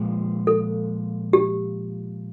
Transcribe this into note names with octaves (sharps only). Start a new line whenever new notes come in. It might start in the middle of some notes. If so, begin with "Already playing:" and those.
Already playing: A#2 F3 G#3
A4
G4